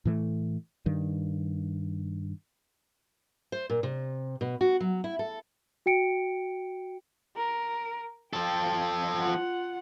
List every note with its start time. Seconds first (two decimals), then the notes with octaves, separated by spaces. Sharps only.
0.05 A2 E3 A3
0.86 G2 D#3
3.52 C5
3.70 A#2
3.83 C3
4.41 B2
4.61 F#4
4.80 F#3
5.04 E4
5.19 A4
5.86 F#4 G5 C#7 D7
7.36 A#4
8.33 F3 A4 G5
9.19 F4 F#5